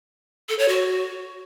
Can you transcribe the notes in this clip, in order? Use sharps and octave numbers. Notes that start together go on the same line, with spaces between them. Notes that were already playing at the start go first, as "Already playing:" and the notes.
A4
C#5
F#4